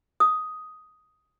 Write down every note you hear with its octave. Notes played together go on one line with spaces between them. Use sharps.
D#6